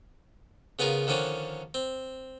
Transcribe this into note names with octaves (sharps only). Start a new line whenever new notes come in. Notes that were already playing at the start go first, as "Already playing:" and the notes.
C#3 B3 F4 G#4 A#4
D3 D#3 F3 C#4 D4
C4